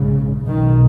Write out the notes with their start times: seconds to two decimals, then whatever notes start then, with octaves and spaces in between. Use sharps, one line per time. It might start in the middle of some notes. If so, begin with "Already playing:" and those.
Already playing: A#1 G#2 C#3
0.47 B1 B2 D#3